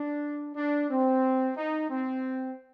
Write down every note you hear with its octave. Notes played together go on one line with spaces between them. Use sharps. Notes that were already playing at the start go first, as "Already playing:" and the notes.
Already playing: D4
D4
C4
D#4
C4